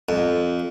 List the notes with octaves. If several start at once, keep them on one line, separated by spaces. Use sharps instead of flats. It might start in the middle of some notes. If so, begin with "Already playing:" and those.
F2